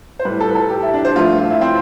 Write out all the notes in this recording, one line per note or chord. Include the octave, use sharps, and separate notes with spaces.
C5
A2 G3 B4
A4
B4
A4
G4
E4
D4
C5
G2 F3 A3 F4
F4
E4
C4